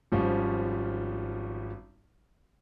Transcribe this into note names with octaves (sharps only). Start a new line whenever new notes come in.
G#1 F3 G3 C#4 F4 C#6